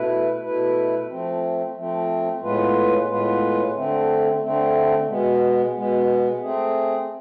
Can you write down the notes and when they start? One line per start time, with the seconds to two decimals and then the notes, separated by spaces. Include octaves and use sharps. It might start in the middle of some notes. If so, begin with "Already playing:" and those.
Already playing: B2 A3 E4 B4
0.42 B2 A3 E4 B4
1.09 F3 A3 C4
1.75 F3 A3 C4
2.41 A2 G#3 B3 F4 B4
3.08 A2 G#3 B3 F4 B4
3.75 D3 A3 C4
4.41 D3 A3 C4
5.08 B2 G#3 B3
5.75 B2 G#3 B3
6.41 A3 C4 G#4